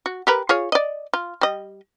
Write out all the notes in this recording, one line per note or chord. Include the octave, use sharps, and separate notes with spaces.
F#4
G4 A#4 B4
F4 G#4 C#5
D5 D#5
F4
G3 D#5